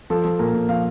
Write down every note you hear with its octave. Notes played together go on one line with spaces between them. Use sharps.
F3 A4
F3
A#2 A#4
A#2
F3 F5